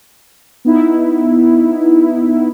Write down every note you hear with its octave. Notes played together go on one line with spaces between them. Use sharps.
B3 D#4 E4